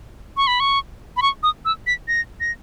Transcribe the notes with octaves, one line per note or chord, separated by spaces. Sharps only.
C#6
B5
C#6
B5
C#6
D#6
E6
B6
A#6
A#6